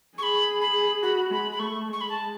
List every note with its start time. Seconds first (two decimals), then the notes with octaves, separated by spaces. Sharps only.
0.18 G#4 B5 C#6
0.61 B5
1.02 F#4 B5
1.31 G#3 B5
1.51 B5
1.59 A3 C#6
1.88 G#3 C#6
2.00 B5
2.09 A5